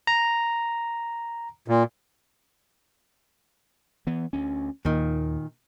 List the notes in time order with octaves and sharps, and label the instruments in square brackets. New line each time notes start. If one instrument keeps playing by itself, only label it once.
[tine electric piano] A#5
[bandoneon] A#2
[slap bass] E3 B3
D2 C#4
[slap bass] D#2 [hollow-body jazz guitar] A#2 D#3